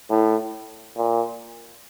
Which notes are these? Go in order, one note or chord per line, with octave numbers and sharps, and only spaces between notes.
A2
A#2